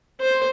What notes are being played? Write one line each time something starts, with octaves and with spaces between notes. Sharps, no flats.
C5